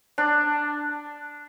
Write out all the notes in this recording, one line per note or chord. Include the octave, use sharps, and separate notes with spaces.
D4